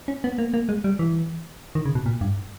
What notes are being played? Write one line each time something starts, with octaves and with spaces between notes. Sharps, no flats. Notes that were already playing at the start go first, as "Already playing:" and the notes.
C#4
B3
A#3
A#3
G#3
G3
E3
D#3
C#3
B2
A#2
G2